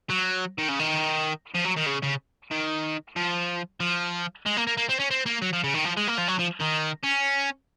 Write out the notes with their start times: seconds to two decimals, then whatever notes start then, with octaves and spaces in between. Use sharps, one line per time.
0.10 F#3
0.58 D#3
0.68 C#3
0.79 D#3
1.55 F3
1.65 F#3
1.77 D#3
1.86 C#3
2.03 C#3
2.51 D#3
3.16 F3
3.80 F3
4.46 G#3
4.57 A#3
4.67 A#3
4.77 A#3
4.89 C4
4.99 C#4
5.10 C4
5.26 A#3
5.42 F#3
5.53 F3
5.64 C#3
5.74 D#3
5.85 F3
5.97 G#3
6.07 A#3
6.18 F3
6.28 F#3
6.39 F3
6.61 D#3
7.04 C#4